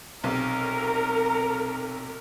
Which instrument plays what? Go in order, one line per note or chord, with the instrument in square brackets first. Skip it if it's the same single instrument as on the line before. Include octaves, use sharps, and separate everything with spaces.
[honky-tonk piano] B1 C3 [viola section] A#4